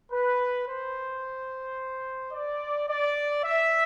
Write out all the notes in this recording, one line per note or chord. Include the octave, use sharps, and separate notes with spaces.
B4
C5
D5
D5
E5